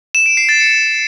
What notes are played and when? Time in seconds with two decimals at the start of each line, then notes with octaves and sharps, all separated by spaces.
0.15 E7
0.26 D7
0.37 C7
0.49 A6
0.60 C#7